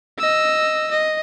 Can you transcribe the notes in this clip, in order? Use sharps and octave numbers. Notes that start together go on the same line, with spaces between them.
D#5 E6
D#5